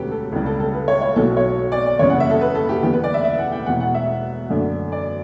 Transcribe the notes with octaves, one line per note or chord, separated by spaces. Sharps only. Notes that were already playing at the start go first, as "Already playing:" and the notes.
Already playing: E1 D2 D3 F#3 C#4 G4 A4 B4
A4
C#2 C#3 G3
A4
A4
B4
C#5
C#5
B1 B2 F#3 A4
C#5
D5
D5
F#1 E2 C#3 G3 C#4 C#5
F#5
E5
A4
B4
A4
G4
E2 D3 G3 B3 G4
B4
D5
E5
E5
F#5
G5
E1 E2 B2 F#5
F#5
E5
F#2 D3 A3 D4
D5